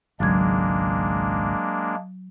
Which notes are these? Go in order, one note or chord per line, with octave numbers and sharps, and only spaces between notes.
G#1 C#2 F#3 G#3 A#3 D4 G#6